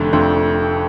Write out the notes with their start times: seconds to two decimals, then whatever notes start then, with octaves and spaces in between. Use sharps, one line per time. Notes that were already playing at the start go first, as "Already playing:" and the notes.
Already playing: F1 F2 D3 F3 A3
0.12 F2 D3 F3 A3